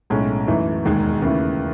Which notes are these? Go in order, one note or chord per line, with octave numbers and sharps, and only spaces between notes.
B1 A2 G#3 C#4
F#2 E3 A3 D#4
E1 D#2 D#3 G#3 D#4
D#2 C#3 E3 A3